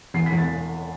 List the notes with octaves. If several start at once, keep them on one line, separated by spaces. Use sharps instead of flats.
E2 C7
B6
E2
A6